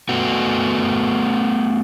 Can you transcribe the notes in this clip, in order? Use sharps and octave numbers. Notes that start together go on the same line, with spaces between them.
A3 B3 F#4